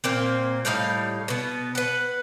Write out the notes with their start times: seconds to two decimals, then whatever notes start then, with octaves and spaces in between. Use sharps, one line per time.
0.04 A#2 A#3 C4
0.65 A2 G3 D#4 F5
1.28 B2 B3
1.75 B4 F#5